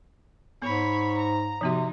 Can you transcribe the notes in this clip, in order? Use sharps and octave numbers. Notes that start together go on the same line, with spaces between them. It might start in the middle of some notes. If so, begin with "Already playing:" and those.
G#2 B3 C#5 B5
A#5
C3 F3 B3 D#4 F#4